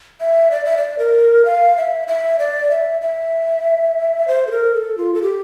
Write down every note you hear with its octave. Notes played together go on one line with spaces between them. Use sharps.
E5
D5
E5
D5
A#4
F5
E5
E5
D5
E5
E5
C5
A4
A#4
A4
F4
A4
G4